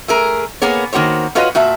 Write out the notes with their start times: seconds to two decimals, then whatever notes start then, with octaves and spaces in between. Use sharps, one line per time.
0.08 A3 G#4 A#4
0.62 A#3 B3 G#4 C#5
0.93 D#3 A#3 F#4 C5 C#5
1.35 F4 F#4 B4 C#5 D#5 F5
1.55 A#2 F#4 E5 A5